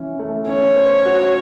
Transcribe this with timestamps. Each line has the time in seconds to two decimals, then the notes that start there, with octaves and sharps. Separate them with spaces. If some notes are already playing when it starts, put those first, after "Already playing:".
Already playing: E3 C#4
0.19 A3
0.47 C#4 C#5
0.76 C5
1.05 F#4